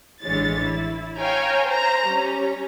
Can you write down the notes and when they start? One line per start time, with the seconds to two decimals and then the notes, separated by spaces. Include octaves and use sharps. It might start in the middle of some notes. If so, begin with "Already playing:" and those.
0.22 A1 D3 E3 G#3 C#5 A6
0.62 E4
1.17 C#5 F5 G5 G#5 A#5
1.66 C5 A#5
2.07 G3 C#4